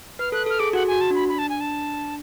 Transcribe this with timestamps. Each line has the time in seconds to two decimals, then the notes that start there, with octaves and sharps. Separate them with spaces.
0.19 B4 F6
0.32 A4 F#6
0.46 A4 F6
0.59 G#4 D6
0.73 F#4 F#5
0.88 F#4 G#5
1.01 A5
1.10 D4 B5
1.29 B5
1.38 A5
1.49 G#5
1.61 A5